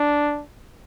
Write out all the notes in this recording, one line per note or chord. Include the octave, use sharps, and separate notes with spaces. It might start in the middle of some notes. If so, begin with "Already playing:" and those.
Already playing: D4